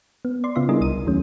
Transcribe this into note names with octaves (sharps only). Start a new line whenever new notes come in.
B3
D5 C6
C#3 B3 F4 E5 C6
G3 D4 E4 G#4 A#4 D#5
C2 D#5 D#7
D#2 D#3 F#3 A3 C#4